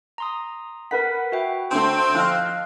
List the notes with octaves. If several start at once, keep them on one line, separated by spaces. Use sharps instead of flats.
A#5 C6 D#6
A#4 B4 F#5 B6
F#4 E5 G5
D3 A3 C4
F3 D#5 F5 F6 F#6